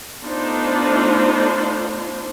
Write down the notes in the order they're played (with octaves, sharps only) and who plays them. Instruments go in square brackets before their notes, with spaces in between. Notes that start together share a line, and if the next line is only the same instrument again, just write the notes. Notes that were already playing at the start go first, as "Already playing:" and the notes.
[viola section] A3 B3 D4 D#4 F4 C5